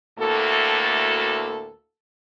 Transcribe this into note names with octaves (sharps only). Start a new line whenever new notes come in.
D2 A2 A#3 F#4 A4